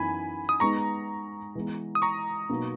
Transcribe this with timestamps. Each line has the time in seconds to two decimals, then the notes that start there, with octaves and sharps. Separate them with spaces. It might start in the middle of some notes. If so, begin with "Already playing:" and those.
Already playing: F#2 E3 B3 D#4 G#5 B5
0.49 D#6
0.60 G#3 B3 D#4 A#5 C#6
1.55 E3 G#3 B3
1.95 D#6
2.02 A#5 C#6
2.49 B2 F#3 A#3 D#4